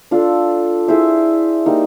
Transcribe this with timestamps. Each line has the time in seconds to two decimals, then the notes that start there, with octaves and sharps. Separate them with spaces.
0.11 D4 F4 A4
0.88 E4 G#4 C5 E5
1.66 G3 A#3 D#4